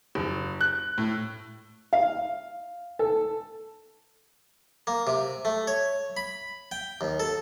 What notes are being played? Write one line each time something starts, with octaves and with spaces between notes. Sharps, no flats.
F#1
F#6
A2
F5
A4
A#3
C3
A3
C#5
B5
G5
D#2
A4